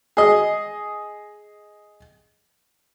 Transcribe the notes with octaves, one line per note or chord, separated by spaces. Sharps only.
G#4 D#5